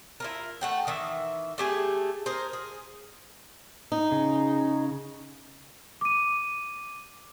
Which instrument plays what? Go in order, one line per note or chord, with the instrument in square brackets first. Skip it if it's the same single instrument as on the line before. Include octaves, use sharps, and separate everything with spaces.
[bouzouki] E4 F4 A#4
A3 F#5 G5
D#3 E3 E5
A3 G4 G#4 G#5
G#4 A#4 C5
G#4
[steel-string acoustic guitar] D#4
[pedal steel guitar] C#3
[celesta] D6 D#7